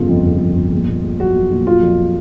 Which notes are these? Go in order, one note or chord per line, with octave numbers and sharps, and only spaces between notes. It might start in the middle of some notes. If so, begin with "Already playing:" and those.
Already playing: G1 C#3 F4
F2
G1
F2
G1
A#1
A#2
A#1
F#3 F#4
F#3
A#2
F#3 F4
F2